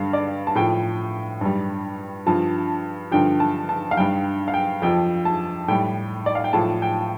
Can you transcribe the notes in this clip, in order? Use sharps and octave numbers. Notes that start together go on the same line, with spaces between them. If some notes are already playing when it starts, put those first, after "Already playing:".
Already playing: G2 D3 G3 F5
D5
A5
A2 F3 G5
G2 G3
G2 F3 A5
G2 D3 F3 G5
A5
A5
F5
G2 G3 G5
F5
G5
F2 F3 G5
A5
A2 G3 G5
D5
F5
G5
A2 F3 A5
G5